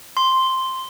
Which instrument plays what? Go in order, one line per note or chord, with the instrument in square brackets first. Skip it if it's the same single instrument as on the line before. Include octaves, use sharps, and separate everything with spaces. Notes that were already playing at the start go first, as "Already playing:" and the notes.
[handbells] C6